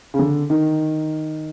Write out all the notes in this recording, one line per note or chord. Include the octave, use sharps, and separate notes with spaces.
C#3
D3
D#3